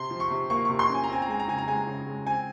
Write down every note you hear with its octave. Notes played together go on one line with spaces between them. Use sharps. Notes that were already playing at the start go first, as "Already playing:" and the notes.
Already playing: C3 C6
F3
C#6
C3
A#3 C#6
C3 C#6
C6
C#4
G#5
A#5
C4 G#5
A#5
G#3 G#5
A#5
C#3 G#5
A#5
G#3 G#5
C#3
G#3
C4 G#5